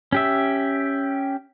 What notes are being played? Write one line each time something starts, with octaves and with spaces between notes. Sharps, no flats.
C#4 G4 E5